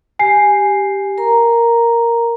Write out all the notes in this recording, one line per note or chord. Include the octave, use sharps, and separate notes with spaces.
G4 G#5 C7
A#4 A#5